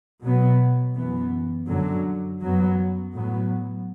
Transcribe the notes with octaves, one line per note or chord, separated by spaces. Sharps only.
B2 F#3 B3
F#2 E3 B3
F#2 D3 F#3
F#2 F#3 B3
A2 F#3 B3